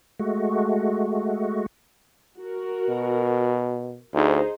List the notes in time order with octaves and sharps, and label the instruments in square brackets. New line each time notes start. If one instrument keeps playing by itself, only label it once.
[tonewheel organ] G#3 A3 F#4
[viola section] F#4 A#4
[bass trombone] B2
[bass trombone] D2 [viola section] D#4 G#4 C5